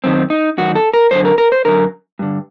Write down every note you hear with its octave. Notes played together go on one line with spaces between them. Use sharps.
F#2 D#3 C4
D#4
F#2 D#3 F#4
A4
A#4
F#2 D3 C5
A#4
A#4
C5
F#2 D3 A#4
G2 D3